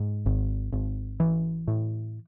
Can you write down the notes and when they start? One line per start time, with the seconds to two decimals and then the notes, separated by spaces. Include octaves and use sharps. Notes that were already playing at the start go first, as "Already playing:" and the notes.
Already playing: G#2
0.26 G#1
0.73 G#1
1.20 E3
1.68 A2